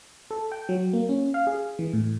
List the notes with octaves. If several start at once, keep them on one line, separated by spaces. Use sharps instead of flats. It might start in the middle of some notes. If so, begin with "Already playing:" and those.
A4
G5
F#3
A#3
C#4
F5
G#4
E3
A2